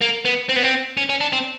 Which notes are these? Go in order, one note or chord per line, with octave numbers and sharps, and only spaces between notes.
A#3
B3
C4
B3
C4
C#4
C#4
D4
C4